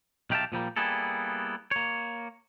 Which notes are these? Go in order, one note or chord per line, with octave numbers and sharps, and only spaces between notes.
B1 D#3 G4 E5 F5 A5
A#2 F3 G3 A#3
G3 A#3 B3 E4 G#4 A4
A#3 C#5